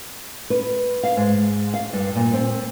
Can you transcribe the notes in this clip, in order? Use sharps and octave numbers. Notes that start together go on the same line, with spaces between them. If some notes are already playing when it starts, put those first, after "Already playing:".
B4
F5
G#2
F5
G2
A#2
C4